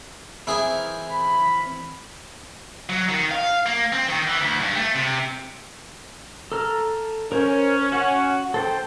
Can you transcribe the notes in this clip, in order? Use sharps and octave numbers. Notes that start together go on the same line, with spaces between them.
E3 C4 E4 G#4 A#4
B5
F#3
D#3
F5
A#3
C4
D#3
E3
D2
G2
A3
C3
A4 A#5 F6
C#4 A#4 C5 C#5
F#4 F#5
A4 C5 G5